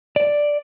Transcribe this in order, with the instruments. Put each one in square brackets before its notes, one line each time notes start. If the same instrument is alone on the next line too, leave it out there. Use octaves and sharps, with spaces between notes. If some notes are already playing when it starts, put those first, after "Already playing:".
[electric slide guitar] D5